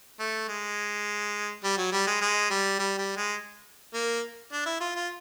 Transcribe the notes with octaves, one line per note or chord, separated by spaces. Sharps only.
A3
G#3
G3
F#3
G3
G#3
G#3
G3
G3
G3
G#3
A#3
D4
E4
F4
F4